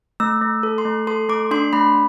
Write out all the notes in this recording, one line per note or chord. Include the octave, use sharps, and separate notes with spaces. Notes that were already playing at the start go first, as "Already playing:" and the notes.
A3 E6
A3
A4
C6
A3
A4 C6
A3 D6
D4 C6
A3 B5